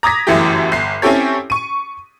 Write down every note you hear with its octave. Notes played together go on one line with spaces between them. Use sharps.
A#5 D6 D#6 G#6 A#6 B6
G1 F#2 E3 A3 G4
G1 C7
C4 C#4 E4 G4 A4 C#5
C#6 D#7